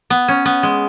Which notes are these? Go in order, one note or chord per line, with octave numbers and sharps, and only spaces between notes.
B3
C#4
B3
G#3